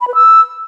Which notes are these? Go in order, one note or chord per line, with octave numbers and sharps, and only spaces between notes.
B5
B4
E6